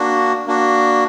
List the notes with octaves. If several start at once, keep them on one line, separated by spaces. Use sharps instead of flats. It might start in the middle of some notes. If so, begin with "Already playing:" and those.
Already playing: A#3 D4 F#4
A#3 D4 F#4